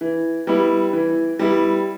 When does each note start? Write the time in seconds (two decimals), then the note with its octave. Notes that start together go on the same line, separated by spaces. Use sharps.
0.01 E3
0.47 G3 B3 E4
0.93 E3
1.39 G3 B3 E4